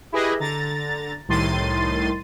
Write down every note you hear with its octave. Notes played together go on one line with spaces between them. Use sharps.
E4 G4 G#4 B4 D#5
D3 A#5 A6
C2 A2 D#3 C6 A6 D#7